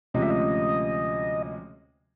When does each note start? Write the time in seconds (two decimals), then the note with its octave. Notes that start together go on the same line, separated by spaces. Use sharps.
0.14 D2 C3 F3 G#3 C#4 D#5
0.22 E5
0.30 D#5